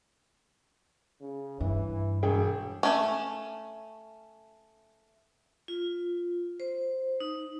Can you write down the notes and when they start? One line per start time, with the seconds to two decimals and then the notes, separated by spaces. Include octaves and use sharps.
1.21 C#3
1.60 G2 E3
2.23 E1 F#2 G#4 G5
2.83 A3 C#4
5.68 F4
6.60 C5
7.20 D#4